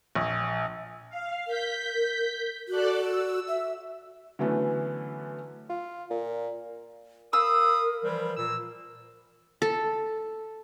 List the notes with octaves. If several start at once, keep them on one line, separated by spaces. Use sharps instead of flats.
A#1
F5
A#4 G6 B6
F#4 A4 D5 F#6
E6
E5
D3 E3 F#3 A3 B3 C#4
F4
A#2
A#4 F5 B5 D#6 E6
E3 F3 G3
A#2 E6
A4